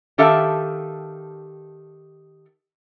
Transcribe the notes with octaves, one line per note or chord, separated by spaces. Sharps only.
D#3 G4 A4 E5 F5 A5